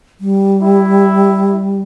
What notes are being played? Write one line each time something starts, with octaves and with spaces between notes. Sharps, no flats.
G3
E4